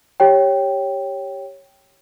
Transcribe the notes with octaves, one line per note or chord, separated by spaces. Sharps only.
G4 C#5 G5